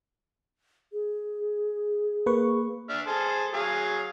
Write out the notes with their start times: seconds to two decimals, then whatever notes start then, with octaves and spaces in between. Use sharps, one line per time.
0.93 G#4
2.26 A#3 B4 C#6
2.90 D4 E5 F6
3.07 G#4 A4 C5
3.54 F#3 G#4 F5